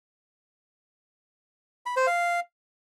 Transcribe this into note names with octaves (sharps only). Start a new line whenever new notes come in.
B5
C5
F5